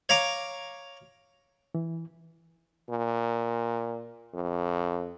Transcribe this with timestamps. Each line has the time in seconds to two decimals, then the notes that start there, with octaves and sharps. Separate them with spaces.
0.09 C#5 F5 A#5 D6
1.75 E3
2.90 A#2
4.34 F2